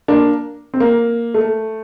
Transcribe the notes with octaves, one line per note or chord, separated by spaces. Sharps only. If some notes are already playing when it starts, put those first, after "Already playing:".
A#3 D4
C4
A#3
A3